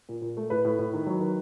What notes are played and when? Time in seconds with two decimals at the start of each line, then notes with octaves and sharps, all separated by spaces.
0.09 A#2
0.22 A#2
0.37 A3
0.50 A2 B4
0.65 A2
0.79 A2
0.93 D#3
1.07 F#3
1.20 D#3